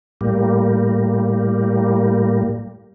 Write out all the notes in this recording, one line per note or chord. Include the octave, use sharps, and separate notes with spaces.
A2 G3 A#3